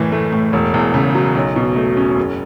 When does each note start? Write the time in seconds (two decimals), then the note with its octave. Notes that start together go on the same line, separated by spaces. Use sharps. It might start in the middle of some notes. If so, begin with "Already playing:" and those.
Already playing: F#1 A2 E3
0.12 A3
0.32 A2
0.53 E1
0.74 E2
0.94 C#3
1.15 F#3
1.35 B1
1.56 B2
1.76 A3
1.97 C#4
2.17 F#1